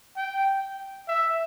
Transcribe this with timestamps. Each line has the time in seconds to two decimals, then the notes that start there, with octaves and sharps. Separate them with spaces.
0.17 G5
1.08 E5